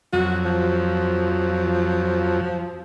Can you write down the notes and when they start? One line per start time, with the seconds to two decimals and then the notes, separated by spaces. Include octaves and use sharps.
0.13 F2 F#3 F#4
0.45 F3